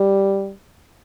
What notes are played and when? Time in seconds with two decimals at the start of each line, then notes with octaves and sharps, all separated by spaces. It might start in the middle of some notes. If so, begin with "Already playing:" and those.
Already playing: G3